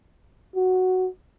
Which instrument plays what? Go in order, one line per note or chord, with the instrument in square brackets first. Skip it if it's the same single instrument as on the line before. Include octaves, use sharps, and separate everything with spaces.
[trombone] F#4